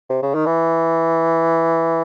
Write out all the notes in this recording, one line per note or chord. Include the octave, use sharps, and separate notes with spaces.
C3
C#3
D#3
E3